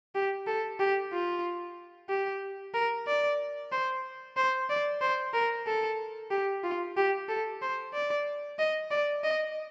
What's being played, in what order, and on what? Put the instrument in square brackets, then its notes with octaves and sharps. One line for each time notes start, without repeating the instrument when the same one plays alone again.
[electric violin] G4
A4
G4
F4
G4
A#4
D5
C5
C5
D5
C5
A#4
A4
G4
F4
G4
A4
C5
D5
D#5
D5
D#5